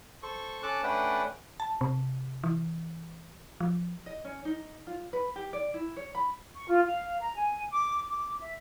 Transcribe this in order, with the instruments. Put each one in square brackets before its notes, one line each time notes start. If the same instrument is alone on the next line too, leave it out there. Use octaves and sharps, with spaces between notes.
[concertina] A4 C5 C#6
C#4 A4 A5 D6 F#6
A3 C#4 D4 B4 F#5 G5
[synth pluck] A5
C3
E3
F3
[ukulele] D#5
C#4
D#4
F4
B4
G4
D5
E4
C#5
B5
[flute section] C#6
F4
F5
A#5
G#5
D6
D6
E5